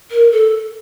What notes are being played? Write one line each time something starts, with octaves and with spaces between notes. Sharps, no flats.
A#4
A4